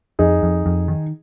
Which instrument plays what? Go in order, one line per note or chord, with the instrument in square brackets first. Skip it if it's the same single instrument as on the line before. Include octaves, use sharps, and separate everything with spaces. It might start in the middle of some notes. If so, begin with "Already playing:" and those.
[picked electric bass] F2 [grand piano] D#4 G#4
[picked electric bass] F2
F2
D#3